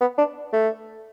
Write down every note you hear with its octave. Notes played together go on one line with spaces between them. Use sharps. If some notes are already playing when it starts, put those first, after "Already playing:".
B3
D4
A3